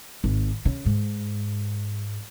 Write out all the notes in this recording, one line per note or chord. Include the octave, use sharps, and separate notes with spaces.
G#1
C#3
G#2